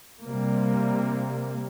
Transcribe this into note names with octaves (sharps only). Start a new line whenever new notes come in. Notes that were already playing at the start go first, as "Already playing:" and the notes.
C3 G3 A#3